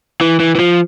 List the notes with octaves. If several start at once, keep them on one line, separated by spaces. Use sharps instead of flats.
E3
E3
E3
F3